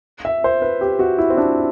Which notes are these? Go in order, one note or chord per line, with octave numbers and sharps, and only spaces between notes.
E5
C5
B4
G4
F#4
E4
C4
D4